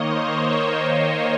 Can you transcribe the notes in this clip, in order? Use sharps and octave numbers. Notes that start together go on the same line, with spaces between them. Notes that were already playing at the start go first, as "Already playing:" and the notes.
Already playing: D#3 A#3 C#5 D#5
C5
C#5
C#5